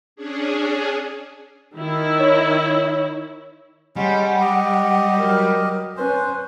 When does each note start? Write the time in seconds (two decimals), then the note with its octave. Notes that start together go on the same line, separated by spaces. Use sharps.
0.16 C#4 D4 G#4
1.73 D#3 E4
2.19 C#5
3.96 G3 G#3 C#4 F#5
4.41 G4 D#5
5.18 F#3 A#4
5.97 C#4 B4 C5